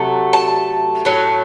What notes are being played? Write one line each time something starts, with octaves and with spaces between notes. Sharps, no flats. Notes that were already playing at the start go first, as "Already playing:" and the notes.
Already playing: C3 F#3 A3 F#5
A5
A2 F#3 A3